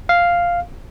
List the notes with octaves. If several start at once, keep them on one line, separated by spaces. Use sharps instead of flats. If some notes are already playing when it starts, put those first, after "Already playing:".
F5